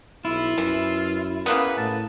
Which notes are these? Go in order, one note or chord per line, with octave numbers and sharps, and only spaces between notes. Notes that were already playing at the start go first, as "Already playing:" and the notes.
B1 E4 F4
F#2 E3
C#3 A#3 B3 B4
A2 A5